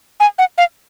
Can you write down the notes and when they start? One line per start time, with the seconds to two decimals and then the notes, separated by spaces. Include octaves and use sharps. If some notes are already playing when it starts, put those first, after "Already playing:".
0.20 G#5
0.38 F#5
0.58 F5